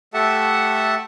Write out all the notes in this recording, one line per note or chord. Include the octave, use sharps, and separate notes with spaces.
A3 G4 A4 E5 F#5 A5